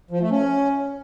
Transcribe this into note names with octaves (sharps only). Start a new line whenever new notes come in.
F3
A3
C#4